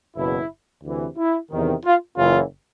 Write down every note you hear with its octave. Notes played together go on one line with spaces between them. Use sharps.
F#1 E2 B2 E4
D2 C3 E3
E4
E2 C3 D#3
F4
F#1 F#2 C#3 E3 F4